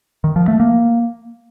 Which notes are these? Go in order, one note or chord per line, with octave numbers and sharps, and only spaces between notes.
D#3
F3
A3
A#3